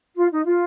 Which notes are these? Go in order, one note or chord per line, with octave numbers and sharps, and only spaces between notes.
F4
D#4
F4